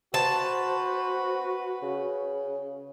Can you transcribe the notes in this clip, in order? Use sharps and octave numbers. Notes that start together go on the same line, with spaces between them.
F#4 B4 C5 A5
C#3